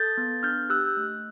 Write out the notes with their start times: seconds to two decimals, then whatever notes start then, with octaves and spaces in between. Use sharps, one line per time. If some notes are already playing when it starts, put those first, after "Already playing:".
Already playing: A4 G6 A6
0.17 B3
0.43 D4 F6 G6
0.70 G4 E6 F#6
0.97 A3